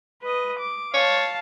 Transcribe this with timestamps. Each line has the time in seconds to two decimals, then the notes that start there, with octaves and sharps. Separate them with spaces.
0.22 B4 D#5
0.59 D6
0.94 C#5 F5 A5